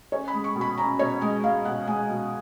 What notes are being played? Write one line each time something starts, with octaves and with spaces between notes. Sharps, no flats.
C#4 C#5
B5
G#3
C#6
B2
B5
C#4 A#5
B2 C#5
G#3 D#5
G#3 F5
B2 F#5
G#3 G#5
B2